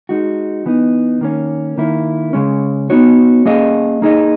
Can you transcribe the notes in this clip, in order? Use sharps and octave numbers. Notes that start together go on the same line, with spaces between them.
G#3 D#4 F#4
E3 B3 D#4
D#3 A#3 C#4
D#3 A#3 E4
C#3 G#3 C#4
B3 D#4 F#4 C#5
A#3 C#4 G#4 D#5
A#3 D#4 G#4 D#5